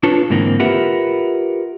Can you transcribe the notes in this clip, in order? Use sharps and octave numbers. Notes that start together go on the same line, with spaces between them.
D4 F4 A4 B4 C#5
G#2 D3 E3 A#3 C4
F4 G4 A#4 B4 E5 F#5